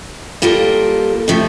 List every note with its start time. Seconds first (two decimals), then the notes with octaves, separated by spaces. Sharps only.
0.42 G3 A#3 F4 A4
1.28 C3 F3 A3